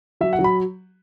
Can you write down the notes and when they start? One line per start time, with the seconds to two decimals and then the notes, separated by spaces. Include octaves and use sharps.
0.21 F#3 E5
0.33 F#5
0.39 F#3
0.44 B5